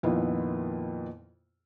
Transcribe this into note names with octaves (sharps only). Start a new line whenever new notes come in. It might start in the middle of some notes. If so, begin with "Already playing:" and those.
F2 A#2 D#3 B3 E4 F4